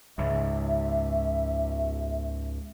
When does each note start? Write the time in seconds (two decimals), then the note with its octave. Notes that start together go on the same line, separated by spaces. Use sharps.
0.18 C#2 G#2 E5